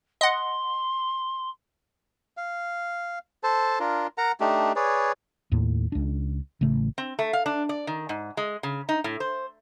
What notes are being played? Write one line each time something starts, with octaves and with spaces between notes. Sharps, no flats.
D#5 F#5 C6
F5
A4 C5 A5
D4 F4 A#4
A#4 F#5 A#5
A3 D4 D#4 G4
G#4 B4 C#5 D5
D#2 A2
C#2 D4
A1 C#3 A3
C4
A3
F5
D4
D5
D#3
G#2
G#3
C#3
D#4
A2
C5